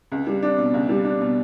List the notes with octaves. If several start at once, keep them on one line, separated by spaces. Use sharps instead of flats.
C#2
G3
D4
B2
C#2
G3
D4
B2